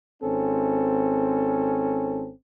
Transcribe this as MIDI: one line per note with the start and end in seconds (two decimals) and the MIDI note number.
0.22 2.30 32
0.22 2.30 60
0.22 2.30 61
0.22 2.30 69